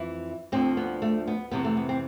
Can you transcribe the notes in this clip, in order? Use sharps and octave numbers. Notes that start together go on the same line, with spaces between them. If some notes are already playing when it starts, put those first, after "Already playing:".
Already playing: F2 E3 E4
D2 D3 F3 C4
B3
A3
B3
F2 C3 E3 B3
A3
B3
C4